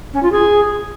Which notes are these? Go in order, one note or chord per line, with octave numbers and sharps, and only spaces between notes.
C#4
F4
G#4